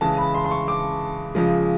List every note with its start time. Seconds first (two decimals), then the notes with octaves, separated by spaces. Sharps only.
0.01 C#3 E3 G#3 A5
0.18 B5
0.34 C6
0.45 C6
0.51 C#6
0.68 D6
1.35 C#3 F3 G#3